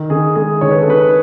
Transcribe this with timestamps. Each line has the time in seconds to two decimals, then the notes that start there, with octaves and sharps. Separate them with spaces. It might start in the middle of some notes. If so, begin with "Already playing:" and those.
Already playing: D#3
0.10 D#3 G#4
0.35 G#3 G#4
0.61 D#3 C#5
0.71 B4
0.80 A4
0.87 D#3 B4